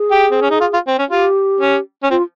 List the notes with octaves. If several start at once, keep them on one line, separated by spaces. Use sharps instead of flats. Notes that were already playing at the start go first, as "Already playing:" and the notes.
Already playing: G#4
G4
C4
C#4
D#4
F4
F4
C4
C#4
F4 G4
C#4
C#4
C4 F4